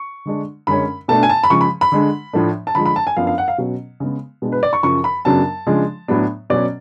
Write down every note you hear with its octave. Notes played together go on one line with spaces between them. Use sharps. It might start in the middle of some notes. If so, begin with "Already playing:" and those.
Already playing: C#6
D3 G#3 D4
F#2 D3 G#3 C#4 B5
B2 A3 D4 A5
G#5
A5
B5
C#3 F3 G#3 C#6
B5
B5
D3 G#3 D4
A2 F3 A3 D4
A5
D3 F3 G#3 B5
B5
A5
G#5
F#2 F3 B3 D4 F5
F5
F#5
F5
B2 F#3 C#4
C#3 G#3 B3
B2 G#3 D4
B4
D5
C#6
F#2 C#3 F3 C#6
B5
F#2 C#3 F#3 B3 D4 A5
C#3 F3 G#3 D4
A2 F#3 B3 D4
B2 F#3 C#4 D5